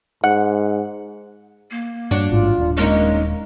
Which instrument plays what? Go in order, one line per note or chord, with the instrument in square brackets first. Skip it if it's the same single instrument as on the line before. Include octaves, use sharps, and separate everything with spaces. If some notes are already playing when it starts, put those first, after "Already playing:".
[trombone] G#2 [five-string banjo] F#5
[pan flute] A#3
[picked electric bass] G2 [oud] D4 F#4 C#5
[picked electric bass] A1 G#2 [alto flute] F4
[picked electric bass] D#1 D4
[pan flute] G#3 [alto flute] A#3 [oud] C#4 D#4